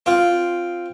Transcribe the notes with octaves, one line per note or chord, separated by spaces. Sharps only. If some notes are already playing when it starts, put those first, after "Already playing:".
C4 F4